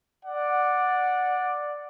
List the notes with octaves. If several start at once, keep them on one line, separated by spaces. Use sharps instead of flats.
D5 F#5